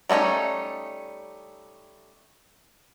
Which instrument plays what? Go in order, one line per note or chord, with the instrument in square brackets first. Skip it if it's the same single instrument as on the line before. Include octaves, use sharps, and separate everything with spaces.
[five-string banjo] G3 A3 C4 C#4 D#4